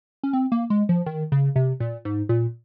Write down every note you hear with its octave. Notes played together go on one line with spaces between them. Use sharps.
C#4
C4
A#3
G#3
F3
D#3
C#3
C3
A#2
G#2
A#2